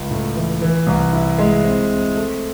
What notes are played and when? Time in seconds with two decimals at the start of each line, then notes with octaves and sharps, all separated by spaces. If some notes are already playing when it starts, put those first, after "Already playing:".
Already playing: C#2
0.10 A2
0.36 E3
0.62 E3
0.87 C2
1.13 E4
1.38 G#3
1.64 C4
1.90 C4
2.15 A3